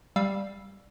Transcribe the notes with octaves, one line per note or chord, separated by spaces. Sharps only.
G3 F5 E6